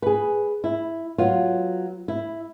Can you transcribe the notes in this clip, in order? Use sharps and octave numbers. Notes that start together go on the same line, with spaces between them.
G#4 B4
E4
F#3 B3 F4
E4